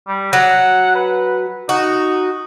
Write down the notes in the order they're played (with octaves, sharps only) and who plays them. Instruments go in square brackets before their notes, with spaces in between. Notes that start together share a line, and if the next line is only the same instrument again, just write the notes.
[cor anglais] G3
[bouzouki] F#3 [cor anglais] F#5
[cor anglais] B4
[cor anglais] D#4 [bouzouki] F#4